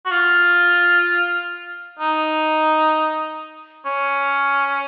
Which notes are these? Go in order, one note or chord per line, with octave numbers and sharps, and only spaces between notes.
F#4
F4
D#4
C#4